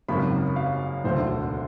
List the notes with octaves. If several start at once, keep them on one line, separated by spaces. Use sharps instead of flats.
G#1 F#2 C#3 F#3 A#3 B5
F5
E1 D2 D3 C5